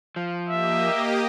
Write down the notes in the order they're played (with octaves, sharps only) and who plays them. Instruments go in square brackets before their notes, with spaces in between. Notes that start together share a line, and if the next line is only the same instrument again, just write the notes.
[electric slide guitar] F3
[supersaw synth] A#3 G4 D#5 [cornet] E5